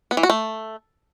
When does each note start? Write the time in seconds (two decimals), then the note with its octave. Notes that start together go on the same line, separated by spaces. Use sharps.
0.11 B3
0.17 E3
0.23 F#4
0.30 A3